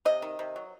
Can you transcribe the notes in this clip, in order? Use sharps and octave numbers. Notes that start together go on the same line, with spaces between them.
C3 D#5
D#3
C3
F#3